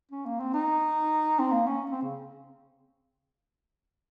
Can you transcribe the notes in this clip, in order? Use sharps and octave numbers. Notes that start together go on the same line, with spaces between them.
C#4
A#3
C4
D#4
C4
A#3
C#4
C4
C#3